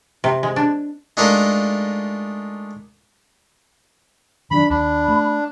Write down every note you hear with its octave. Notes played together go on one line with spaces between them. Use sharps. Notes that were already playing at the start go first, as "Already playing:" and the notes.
C3
G#3
D4
G#3 A3 D4 D#4 F4 A#4
D#3 E3 F#3 D4 B5
D#2 D4 B5
A3